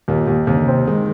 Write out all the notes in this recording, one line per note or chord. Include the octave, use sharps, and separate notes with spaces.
D#2 A#2
D#2
D#2 C3
D3
C3 C4
D#3 G#3